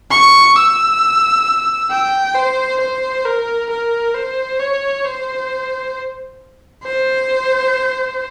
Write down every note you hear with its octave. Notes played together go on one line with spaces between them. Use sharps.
C#6
E6
G5
C5
C5
A#4
A#4
C5
C#5
C5
C5